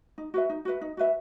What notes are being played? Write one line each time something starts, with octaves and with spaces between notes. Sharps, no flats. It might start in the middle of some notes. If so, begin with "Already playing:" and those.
D#4
F#4 B4 E5
D#4
F#4 B4 E5
D#4
F#4 B4 E5